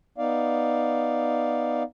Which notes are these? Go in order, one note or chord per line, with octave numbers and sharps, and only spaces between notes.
B3 D#4 D5 F5